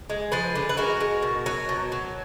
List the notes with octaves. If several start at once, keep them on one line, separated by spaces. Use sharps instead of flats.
G#3
F3 G#4 B4
D3
B4
G#3 F#4 A#4
G#3
B2
F#3
B2
F#3